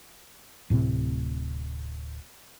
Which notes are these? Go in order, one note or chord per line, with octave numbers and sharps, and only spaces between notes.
D1 A2 C3 C4